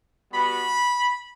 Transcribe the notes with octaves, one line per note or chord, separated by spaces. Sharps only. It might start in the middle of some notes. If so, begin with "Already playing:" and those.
G3 B3 F#4 B5